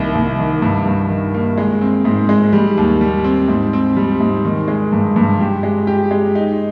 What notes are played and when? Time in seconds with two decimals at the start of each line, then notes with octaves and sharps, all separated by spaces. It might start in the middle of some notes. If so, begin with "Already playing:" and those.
Already playing: C2 D#3 A#3
0.15 C2
0.39 D#3
0.62 G2
0.85 G2
1.10 D#3
1.34 A#3
1.58 G#3
1.81 C4
2.05 G#2
2.29 G#3
2.53 G3
2.77 D#2
3.01 G3
3.24 C4
3.48 G#2
3.73 C4
3.97 G3
4.21 G#2
4.45 D#3
4.68 G#3
4.92 G2
5.16 G2
5.40 G4
5.63 G#3
5.87 G4
6.11 G#3
6.35 D#4